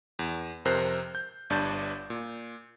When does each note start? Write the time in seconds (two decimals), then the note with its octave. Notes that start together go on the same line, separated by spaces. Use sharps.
0.19 E2
0.65 F2 C3 A#4 C5 F#6 C7
1.15 G6
1.50 G1 G2 D4 A5 G6 A6
2.10 A#2